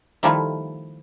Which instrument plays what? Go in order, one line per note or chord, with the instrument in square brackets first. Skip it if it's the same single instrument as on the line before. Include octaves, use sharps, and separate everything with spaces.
[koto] D#3 F3 G3 A3 E4 F4